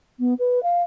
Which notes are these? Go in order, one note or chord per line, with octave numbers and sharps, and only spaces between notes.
B3
B4
F5